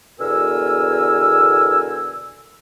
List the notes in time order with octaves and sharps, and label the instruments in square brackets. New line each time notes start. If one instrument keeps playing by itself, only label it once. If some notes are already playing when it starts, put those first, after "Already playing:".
[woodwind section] E2 B2 D3 A#4 G#5 E6